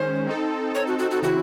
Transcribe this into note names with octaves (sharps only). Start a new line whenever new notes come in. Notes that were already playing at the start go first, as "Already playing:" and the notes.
Already playing: D#3 G#3 C#4 C5
C4 D#4 A4
C#5
F#4
F#4
F#4
C#3 E3 C4 E4 F#4